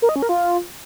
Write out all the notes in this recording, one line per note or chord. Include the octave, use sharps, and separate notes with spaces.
A#4
D#5
C#4
A#4
F4